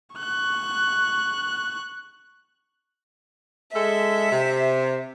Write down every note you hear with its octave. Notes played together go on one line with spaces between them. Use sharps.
C#6 F#6
G#3 A4 E5
C3